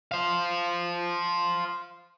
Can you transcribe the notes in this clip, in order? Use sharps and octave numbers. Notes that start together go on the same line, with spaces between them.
C5 F5